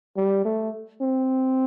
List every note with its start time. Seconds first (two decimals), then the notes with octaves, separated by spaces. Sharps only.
0.17 G3
0.45 A3
1.01 C4